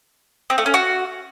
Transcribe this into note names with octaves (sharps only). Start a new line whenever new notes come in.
C4
A3
C#4
F#4